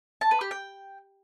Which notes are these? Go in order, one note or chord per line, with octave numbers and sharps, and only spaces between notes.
A5
B4
G4
G5